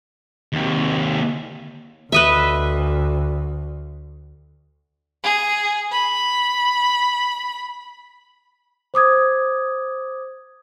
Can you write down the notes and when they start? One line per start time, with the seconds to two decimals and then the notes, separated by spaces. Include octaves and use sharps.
0.53 D#2 C3
2.12 D2 B4 D#5 E5
5.24 G#4
5.91 B5
8.94 C5 D6 D#6 G#6